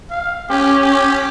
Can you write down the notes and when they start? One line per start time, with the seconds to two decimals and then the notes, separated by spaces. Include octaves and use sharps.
0.10 F5
0.50 C#4 G4
0.82 G4